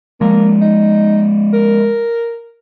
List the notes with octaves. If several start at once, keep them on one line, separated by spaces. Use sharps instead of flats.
F3 G#3 A#3
D#4
A#4